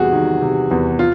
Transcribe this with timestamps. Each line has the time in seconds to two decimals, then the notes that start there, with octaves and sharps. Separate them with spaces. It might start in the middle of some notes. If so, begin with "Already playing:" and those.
Already playing: E2 C3 G3 F#4 G#4
0.12 D#3
0.41 C3
0.71 E2
0.99 F4